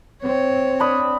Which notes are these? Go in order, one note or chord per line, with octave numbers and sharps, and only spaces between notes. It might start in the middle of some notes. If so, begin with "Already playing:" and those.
C4 C#5
D4 B5 D#6